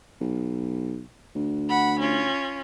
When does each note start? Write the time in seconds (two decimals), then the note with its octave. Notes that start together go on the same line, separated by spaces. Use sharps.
0.21 B1
1.35 D2
1.69 F#5 B5
1.99 C#4 F4